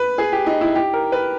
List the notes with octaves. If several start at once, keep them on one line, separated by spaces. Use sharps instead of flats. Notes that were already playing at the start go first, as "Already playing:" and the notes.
Already playing: B4
G#4
G4
D#4
E4
G4
A#4
B4